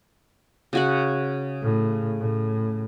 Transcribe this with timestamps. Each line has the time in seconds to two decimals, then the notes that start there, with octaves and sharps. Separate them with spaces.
0.73 C#3 F#4 F#5
1.62 A2
2.19 A2